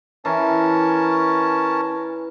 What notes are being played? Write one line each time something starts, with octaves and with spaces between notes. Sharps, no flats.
E3 C#4 A#4 A5